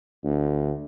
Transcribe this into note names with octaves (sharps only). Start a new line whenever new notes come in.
D2